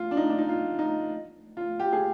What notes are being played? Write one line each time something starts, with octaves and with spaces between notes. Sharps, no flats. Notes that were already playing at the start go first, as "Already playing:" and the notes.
Already playing: F4
D4
D#4
D4
D#4
F4
D#4
F4
G4
G#4